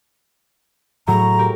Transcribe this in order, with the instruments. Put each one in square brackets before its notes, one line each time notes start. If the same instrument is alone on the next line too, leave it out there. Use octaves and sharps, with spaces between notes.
[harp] A2 F#3 [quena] A#5
[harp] G4 A#4